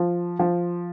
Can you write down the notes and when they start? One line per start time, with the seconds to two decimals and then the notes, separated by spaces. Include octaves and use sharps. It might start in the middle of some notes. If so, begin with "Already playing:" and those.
Already playing: F3
0.39 F3